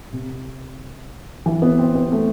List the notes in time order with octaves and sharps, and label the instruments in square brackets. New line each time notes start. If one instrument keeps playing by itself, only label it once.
[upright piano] C3
E3
B3
C4
B3
A3